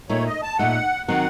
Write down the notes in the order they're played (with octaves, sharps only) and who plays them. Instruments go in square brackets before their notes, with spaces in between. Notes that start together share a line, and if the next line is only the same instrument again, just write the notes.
[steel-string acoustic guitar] A#2 A3 D#4 [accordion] C#5
[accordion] D#5
A5
[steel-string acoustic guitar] A#2 A3 D#4 [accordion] F#5
[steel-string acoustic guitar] D#3 F#3 C4 [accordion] F#5